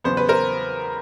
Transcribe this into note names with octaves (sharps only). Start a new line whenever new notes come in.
E2 C#3 F#3 B3 C5
B4
A#4 C5